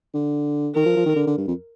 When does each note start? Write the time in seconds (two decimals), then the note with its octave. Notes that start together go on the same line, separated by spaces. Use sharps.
0.14 D3
0.76 D#3 A#4
0.86 F3
0.97 F3
1.06 D#3
1.16 D3
1.27 D3
1.38 G2
1.48 F2